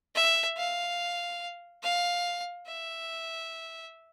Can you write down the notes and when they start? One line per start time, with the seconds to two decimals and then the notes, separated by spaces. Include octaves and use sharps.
0.15 E5
0.57 F5
1.83 F5
2.67 E5